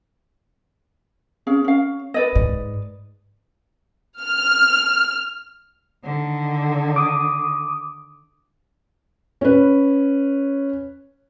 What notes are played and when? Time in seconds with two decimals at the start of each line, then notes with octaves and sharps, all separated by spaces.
1.47 C#4 G#4 F5
1.64 C#4 F5
2.14 B4 D5 D#5
2.36 G#2
4.21 F6
6.04 D3 D#3
6.96 D6 D#6
9.41 C#4 B4